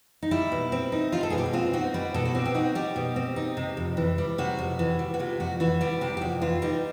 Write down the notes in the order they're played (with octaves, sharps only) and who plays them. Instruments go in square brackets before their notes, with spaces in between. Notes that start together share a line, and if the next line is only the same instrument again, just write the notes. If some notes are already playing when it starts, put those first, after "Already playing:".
[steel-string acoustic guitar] D#4
G3 E4
B2
C4
D#4
G3 F4
A4
B2 G#4
G4
F#4
C4 F4
D#4 F#4
G3 B4
B2 A4
F#4
C4 G4
G4
D#4 F#4
G3 G4
B2
C4
D#4
C3
F2
E3
G3
C3 F#4
F2
E3
G3
F#4
C3 F4
F2 F#4
E3 F#4
G3 G4
C3 G4
G4
F2 F#4
E3 F4
G3 D#4